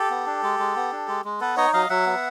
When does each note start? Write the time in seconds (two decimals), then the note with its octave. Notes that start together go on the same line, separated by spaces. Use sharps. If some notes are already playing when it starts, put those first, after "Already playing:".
Already playing: G4 A4
0.10 B3
0.26 D4
0.43 G#3
0.59 G#3
0.76 B3
0.92 D4
1.08 G#3
1.25 G#3
1.40 B3 A4 B4
1.57 D#4 C#5 D#5
1.73 F#3 D#5 F5
1.90 F#3 E5 F#5
2.06 B3